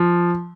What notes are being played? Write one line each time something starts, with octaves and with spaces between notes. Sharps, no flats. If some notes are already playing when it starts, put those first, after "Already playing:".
Already playing: F3